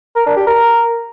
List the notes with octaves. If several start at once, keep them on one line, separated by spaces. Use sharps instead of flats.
A#4
D4
G4
A#4